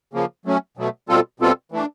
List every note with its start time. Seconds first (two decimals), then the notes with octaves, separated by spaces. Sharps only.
0.13 C#3 F3 A#3
0.46 F#3 A3 C#4
0.77 B2 F#3 A3
1.09 B2 G3 C4 F4 A4
1.40 B2 G3 C4 F4 A4
1.72 E3 A3 D4